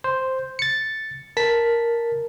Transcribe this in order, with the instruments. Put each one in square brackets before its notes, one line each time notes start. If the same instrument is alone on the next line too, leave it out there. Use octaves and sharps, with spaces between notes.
[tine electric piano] C5
A6 C#7
[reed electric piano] A#4 [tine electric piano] A5 B6